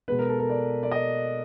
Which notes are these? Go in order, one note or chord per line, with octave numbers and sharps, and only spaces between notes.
B2 G#3 B3 B4
A#4
A4
A#4
D5
D5
D#5